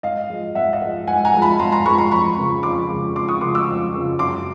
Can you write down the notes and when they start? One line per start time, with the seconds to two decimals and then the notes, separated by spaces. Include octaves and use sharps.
0.03 G#2 D#5 F5
0.30 F3 G#3
0.55 G#2 E5 F#5
0.73 D#5 F5
0.81 F3 G#3
1.07 G#2 F#5 G#5
1.25 G#5 A#5
1.34 F3 G#3
1.42 A5 B5
1.59 G#2 A#5 C6
1.72 A#5 C6
1.85 F3 G#3 B5 C#6
1.98 A#5 C6
2.11 F2 B5 C#6
2.38 C#3 F3 G#3
2.63 F2 C6 D6
2.90 C#3 F3 G#3
3.15 F2 C6 D6
3.28 C#6 D#6
3.41 C#3 F3 G#3 C6 D6
3.55 D6 E6
3.68 F2
3.93 C#3 F3 G#3
4.19 F#2 C6 D6